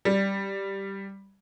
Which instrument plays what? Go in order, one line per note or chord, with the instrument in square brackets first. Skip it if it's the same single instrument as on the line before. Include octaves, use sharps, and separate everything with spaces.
[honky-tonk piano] G3